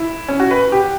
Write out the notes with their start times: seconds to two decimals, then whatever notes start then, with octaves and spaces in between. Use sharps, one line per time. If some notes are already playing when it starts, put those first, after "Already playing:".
Already playing: E4
0.29 C#4
0.40 F#4
0.51 B4
0.72 G4